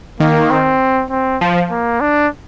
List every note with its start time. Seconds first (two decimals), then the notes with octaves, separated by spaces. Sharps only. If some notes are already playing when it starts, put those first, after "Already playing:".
0.20 D#3 A#3
0.50 C4
1.10 C4
1.41 F3
1.71 A#3
2.01 D4